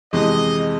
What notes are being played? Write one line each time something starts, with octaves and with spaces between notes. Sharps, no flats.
F2 C3 E3 G#3 D#5